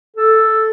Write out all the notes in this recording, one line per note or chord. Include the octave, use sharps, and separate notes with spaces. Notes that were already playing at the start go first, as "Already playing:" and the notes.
A4